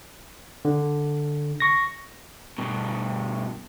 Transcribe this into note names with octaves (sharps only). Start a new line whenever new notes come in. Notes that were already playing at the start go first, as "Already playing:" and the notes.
D3
C#6 A#6
G2 B2